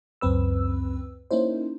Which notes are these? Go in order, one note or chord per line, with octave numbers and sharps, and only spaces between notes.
C#2 F#2 C4 B4 E6
A#3 C#4 D#4 E4 C5